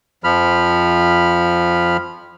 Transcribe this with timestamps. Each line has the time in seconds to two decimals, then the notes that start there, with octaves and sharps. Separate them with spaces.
0.24 F2 F3 B5 F6